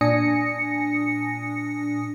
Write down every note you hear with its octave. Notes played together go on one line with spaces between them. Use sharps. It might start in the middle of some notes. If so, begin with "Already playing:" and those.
A#2 D4 G#5 D#6 A#6 C#7